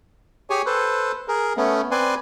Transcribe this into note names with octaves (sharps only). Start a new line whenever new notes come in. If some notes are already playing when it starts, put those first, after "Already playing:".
G4 G#4 C#5 G#5
A4 B4 C5
G#4 A#4
A3 B3 C#4
C4 B4 D5 G#5 C6